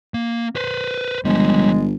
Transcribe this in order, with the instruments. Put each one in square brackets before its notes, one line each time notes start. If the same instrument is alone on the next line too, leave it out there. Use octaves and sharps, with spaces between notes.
[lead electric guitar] A#3
B4 C5
[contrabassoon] G1 [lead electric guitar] F3 G3 [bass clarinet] G#3